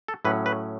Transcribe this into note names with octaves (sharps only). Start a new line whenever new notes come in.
A4
A2 F#3 C#4 B4
B4